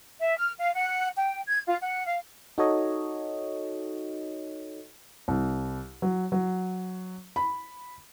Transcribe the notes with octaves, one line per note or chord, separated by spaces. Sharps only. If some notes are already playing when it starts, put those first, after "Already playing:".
E5
F6
F5
F#5
G5
G#6
F4
F#5
F5
D#4 F#4 A4 C#5 D#5
C2
F#3
F#3
B5